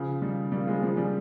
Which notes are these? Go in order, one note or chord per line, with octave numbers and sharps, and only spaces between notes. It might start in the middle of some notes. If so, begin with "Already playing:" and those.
Already playing: C#3 F3
D#3 G3
G3 A#3
F3 G#3
F3 G#3
D#3 G3